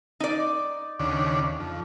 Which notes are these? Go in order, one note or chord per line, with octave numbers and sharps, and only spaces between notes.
D#4 D5
D#2 C#3 D4
F2